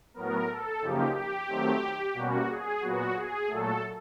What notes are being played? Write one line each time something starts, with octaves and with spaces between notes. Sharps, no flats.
A2 F#3 B3 A#4
A4
F#2 C#3 F3 A#3 D#4 G4
G4
D#3 F#3 A3 C4
B2 G3 A#3 C#4 F#4
G#4
A#2 F#3 B3 F#4
G#4
A#2 F#3 A3 A4